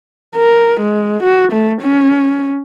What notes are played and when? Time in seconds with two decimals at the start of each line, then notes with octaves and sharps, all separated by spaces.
0.36 A#4
0.81 G#3
1.23 F#4
1.52 A3
1.82 C#4